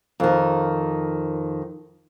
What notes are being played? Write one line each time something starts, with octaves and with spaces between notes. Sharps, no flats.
F2 D#3